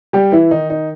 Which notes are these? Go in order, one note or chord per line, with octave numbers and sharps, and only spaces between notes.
G3 G4
E3 E4
D#3 D#4
D#4